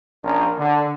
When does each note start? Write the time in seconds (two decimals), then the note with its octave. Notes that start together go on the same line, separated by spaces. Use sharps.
0.23 A#1 C#4 D4 A#4
0.58 D3